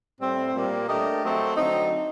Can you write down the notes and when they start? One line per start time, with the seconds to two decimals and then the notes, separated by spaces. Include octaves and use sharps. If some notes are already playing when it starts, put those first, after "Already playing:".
0.19 A2 G3 C4
0.54 A#2 G3 A#3
0.88 A3 D4 G4 A#4 D#5
1.22 F#3 A3 C4
1.56 D3 F#3 C4 D#4